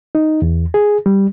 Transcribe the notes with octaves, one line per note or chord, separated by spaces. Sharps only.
D#4
E2
G#4
G3